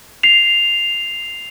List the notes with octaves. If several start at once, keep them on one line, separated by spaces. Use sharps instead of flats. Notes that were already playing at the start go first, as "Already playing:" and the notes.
C7 F7